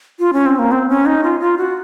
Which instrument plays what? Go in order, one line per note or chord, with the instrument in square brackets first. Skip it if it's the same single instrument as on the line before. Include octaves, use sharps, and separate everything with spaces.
[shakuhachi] F4
C#4
C4
A#3
C4
C#4
D#4
F4
F4
F#4